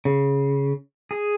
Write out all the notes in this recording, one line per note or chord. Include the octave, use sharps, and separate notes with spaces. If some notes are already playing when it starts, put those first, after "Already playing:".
C#3
G#4